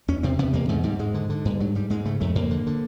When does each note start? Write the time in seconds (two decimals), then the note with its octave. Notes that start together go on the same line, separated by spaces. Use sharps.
0.08 E2 C#4
0.23 C3 C4
0.39 C3 B3
0.53 E2 A#3
0.69 G#2 A3
0.84 G#2 G3
0.99 G#2 G#3
1.14 D3
1.30 D3
1.45 G2
1.60 G#2 F#3
1.75 G#2 G3
1.90 G#2 G#3
2.05 C#3 A3
2.21 F2 A3
2.35 F2 A#3
2.51 D3
2.67 D3